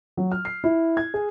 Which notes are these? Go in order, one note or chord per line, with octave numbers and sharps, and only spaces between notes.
F#3
F6
C7
E4
G#6
G#4